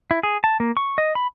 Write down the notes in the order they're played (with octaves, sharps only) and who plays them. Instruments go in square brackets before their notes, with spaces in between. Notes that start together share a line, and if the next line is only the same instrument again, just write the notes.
[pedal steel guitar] E4
G#4
A5
A#3
C#6
D#5
B5